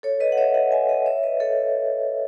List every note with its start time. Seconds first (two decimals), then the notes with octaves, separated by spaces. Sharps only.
0.03 A4 C#5
0.20 B4 D#5
0.32 F#5
0.37 C#5 E5
0.54 D#5 F#5
0.72 E5 G#5
0.89 D#5 F#5
1.06 C#5 E5
1.23 B4 D#5
1.40 A4 C#5